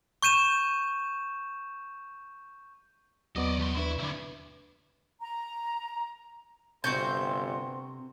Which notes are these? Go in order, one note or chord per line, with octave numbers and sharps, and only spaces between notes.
C#6 G6 D#7 E7
D#2 F#3 B3 D5 D#5 C#6
E2 C6
D4 E4 B4
D2 E4 B5 D6 G#6
A#5
G1 C3 C4 F#4 C6 G6